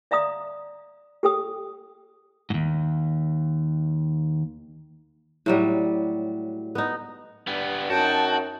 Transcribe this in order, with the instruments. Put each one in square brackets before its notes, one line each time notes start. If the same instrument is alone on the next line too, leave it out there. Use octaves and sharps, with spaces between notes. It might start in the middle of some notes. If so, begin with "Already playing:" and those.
[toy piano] D5 E5 F5 A#5 D#6
G4 A4 G5 D#6
[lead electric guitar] D#2 G#2
[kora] A2 F#3 G3
B3 D#4
[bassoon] G2 [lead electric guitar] G3 B3
[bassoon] F#2 [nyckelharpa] D#4 G5 [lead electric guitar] F#4 [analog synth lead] A5